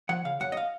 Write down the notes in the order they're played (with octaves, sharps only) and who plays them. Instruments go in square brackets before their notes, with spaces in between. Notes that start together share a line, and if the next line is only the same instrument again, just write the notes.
[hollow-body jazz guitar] F3 F#5
C#3 F5
F#2 F#5
D#5
F5